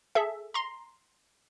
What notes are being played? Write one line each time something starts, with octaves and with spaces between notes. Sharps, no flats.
G#4 A4 E5
A#5 C6